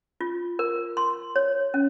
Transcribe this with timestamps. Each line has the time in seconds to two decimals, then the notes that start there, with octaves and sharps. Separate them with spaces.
0.21 F4
0.59 A#4
0.97 C6
1.36 C#5
1.74 C#4